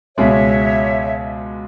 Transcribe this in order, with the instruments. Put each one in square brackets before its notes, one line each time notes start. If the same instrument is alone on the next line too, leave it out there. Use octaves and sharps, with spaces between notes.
[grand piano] C#2 B2 G#3 [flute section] C#5 E5